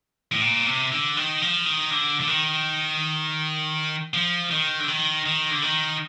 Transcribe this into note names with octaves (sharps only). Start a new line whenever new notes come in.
A2
A#2
C3
D3
D#3
F3
D#3
D3
D3
D#3
F3
D#3
D3
D#3
D#3
D3
D#3